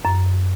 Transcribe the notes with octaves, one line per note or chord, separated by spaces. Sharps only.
F#2